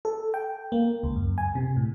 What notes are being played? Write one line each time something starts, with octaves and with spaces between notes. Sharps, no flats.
A4
G5
A#3
C#2
F#2
G#5
C3
A2